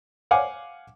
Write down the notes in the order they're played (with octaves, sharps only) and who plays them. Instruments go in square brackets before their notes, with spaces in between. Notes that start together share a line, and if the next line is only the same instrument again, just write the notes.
[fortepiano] F5 F#5 G#5 D6